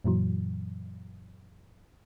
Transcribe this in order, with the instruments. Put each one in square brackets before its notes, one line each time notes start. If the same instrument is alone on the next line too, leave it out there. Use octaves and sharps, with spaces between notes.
[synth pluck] F#2 A#2 E3 F#3